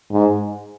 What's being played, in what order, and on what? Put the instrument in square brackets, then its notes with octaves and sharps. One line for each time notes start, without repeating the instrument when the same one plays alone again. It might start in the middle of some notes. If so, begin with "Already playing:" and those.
[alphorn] G#2